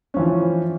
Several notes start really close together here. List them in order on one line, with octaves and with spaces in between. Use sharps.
C#4 F3 E3